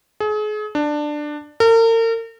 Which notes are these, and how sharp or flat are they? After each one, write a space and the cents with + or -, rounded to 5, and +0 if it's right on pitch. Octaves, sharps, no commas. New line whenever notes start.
G#4 +35
D4 +15
A#4 -40